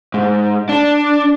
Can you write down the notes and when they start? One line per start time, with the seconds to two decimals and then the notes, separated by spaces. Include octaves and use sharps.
0.14 G#2
0.69 D4